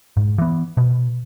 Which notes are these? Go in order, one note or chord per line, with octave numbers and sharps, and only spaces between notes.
G#2
E3 B3
B2